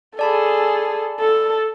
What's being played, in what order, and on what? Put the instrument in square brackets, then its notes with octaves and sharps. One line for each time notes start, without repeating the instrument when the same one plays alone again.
[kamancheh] G#4 A4 [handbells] D5 A5 B5
[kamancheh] A4